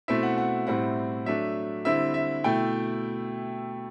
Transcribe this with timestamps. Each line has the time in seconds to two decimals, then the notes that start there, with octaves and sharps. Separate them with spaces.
0.08 B2 A3 C4 E4 E5
0.23 F#5
0.38 F#5
0.67 A2 G3 C4 E4 F#5
1.26 F#3 A3 D4 E5
1.85 D3 G3 C4 E4 E5
2.14 E5
2.44 B2 A3 E4 G5